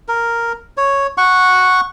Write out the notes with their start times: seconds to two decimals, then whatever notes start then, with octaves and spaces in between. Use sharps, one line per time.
0.08 A#4
0.77 C#5
1.18 F#5 C#6